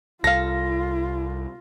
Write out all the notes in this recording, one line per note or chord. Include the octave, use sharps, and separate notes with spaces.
C2 F4 A4 F5 A#6